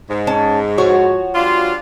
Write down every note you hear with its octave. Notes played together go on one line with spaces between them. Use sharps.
G#2
C#4 A5
F3 F#4 C#5
G3 D4 F4